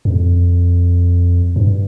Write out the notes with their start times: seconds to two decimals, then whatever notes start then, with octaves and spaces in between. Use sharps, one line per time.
0.05 F2
1.56 G2